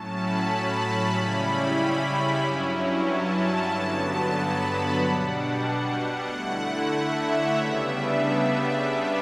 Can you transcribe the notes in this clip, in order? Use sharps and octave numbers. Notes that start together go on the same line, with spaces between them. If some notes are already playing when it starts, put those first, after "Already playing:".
Already playing: A2 F#3 C#4 A5
B5
B5
C#3 G3 C#4 E4
G2 F#3 C#4 E4
A5
G2 D3 F#3 B3
B5
A5
B2 G3 D4 F#5
D3 A3 E4 F#5
E5
C#5
C#3 G3 B3 D4 E5